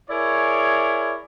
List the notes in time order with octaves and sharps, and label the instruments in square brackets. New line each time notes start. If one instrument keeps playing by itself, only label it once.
[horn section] E4 G#4 A#4 C#5 D5